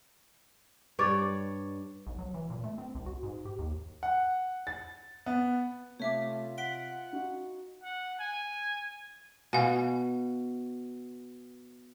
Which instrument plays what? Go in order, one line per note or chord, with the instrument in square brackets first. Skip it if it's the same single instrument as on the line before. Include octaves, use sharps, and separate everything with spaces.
[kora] G2 C#5 D5
[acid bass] B1
F#3
E3
A#2
A3
C4
C2
F#4
G#2
G4
D#2
[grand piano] F#5
A6
B3
[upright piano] C3 [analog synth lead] A3 [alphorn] F4 [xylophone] C#5 E5 D6
[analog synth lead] F#5 [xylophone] B6 D7 G7
[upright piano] D#4 F#4
[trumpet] F#5
G#5
[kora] B2 [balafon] F5 G#5